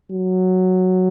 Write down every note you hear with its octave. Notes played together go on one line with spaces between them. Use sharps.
F#3